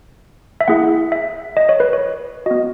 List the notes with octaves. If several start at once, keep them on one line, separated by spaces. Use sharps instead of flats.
E5
A#3 E4 G#4 F#5
E5
D#5
C#5
B4
C#5
B3 F#4 D#5